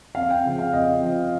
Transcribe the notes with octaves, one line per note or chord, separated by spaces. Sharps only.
F2 F5
G5
C#3 F3
F5
F2 D#5
C#3 F3